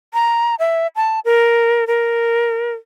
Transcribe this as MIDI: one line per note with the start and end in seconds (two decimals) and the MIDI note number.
0.14 0.55 82
0.59 0.87 76
0.96 1.20 81
1.25 1.87 70
1.87 2.73 70